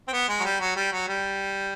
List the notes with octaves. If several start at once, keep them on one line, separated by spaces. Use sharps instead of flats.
C4
B3
G#3
F#3
G3
F#3
G3
F#3
G3